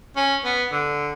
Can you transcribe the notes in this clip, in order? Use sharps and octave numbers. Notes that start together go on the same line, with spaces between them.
C#4
B3
D3